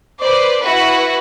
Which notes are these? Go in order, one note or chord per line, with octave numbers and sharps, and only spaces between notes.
B4 C5 D5
E4 F#4 B4